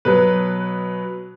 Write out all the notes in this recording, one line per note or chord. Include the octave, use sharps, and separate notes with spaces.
B2 F#3 B4